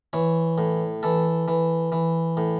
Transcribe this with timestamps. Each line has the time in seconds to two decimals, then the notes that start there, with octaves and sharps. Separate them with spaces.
0.13 E3 C#5
0.58 A2
1.03 E3 A4
1.48 E3
1.92 E3
2.37 A2